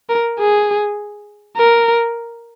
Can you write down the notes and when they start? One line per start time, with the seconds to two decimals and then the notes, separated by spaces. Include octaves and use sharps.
0.09 A#4
0.39 G#4
1.57 A#4